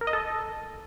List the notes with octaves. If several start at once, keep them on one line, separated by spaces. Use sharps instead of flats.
A#4
D#5
A4